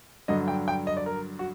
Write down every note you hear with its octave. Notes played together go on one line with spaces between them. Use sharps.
G2 D3 F#3 D#5
G5
G5
D#5
D5
A#4
F#4